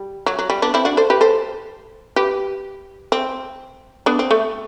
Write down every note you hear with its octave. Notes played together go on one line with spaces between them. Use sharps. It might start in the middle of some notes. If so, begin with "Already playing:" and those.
Already playing: G3
F#3
F#3
G3
B3 D4
C4 E4
D4 F#4
A4 C5
G4 B4
A4 C5
G4 B4
C4
B3 D4
C4
A3